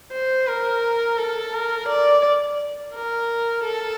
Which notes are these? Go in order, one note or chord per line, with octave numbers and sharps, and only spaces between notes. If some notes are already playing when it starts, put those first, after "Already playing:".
C5
A#4
A4
A#4
D5
A#4
A4